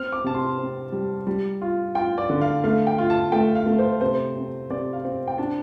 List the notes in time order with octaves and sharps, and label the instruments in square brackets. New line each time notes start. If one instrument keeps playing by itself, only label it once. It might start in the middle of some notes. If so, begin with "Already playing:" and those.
Already playing: [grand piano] C4 F6
D6
C3 A5
C6
C4
G3
G3
F4
F4 G5
D5
D3
F5
A3 F5
G5
F4
A5
A3 G5
F5
A3
C5
C3 C5
C4
C3 D5
F5
C4
G5
D4 A5